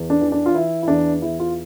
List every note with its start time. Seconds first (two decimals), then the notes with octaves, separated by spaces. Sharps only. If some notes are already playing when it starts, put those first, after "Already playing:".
Already playing: E2
0.10 D4
0.21 E3
0.32 D4
0.46 F4
0.54 E3 E4
0.83 E4
0.88 E2 D4
1.22 E2 E4
1.40 F4